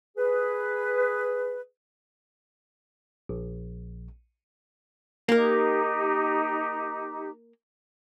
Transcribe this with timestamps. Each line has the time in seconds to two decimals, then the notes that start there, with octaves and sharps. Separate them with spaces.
0.17 G#4 B4
3.29 A#1
5.29 A#3 D#4 G4 A#4